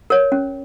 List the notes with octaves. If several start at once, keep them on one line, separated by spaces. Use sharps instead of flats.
A#4 C#5
C#4